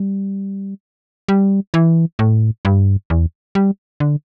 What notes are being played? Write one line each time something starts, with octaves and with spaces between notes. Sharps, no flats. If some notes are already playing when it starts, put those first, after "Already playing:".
Already playing: G3
G3
E3
A2
G2
E2
G3
D3